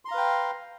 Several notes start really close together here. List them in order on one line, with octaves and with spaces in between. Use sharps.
C6 A#5 F5 B4 G5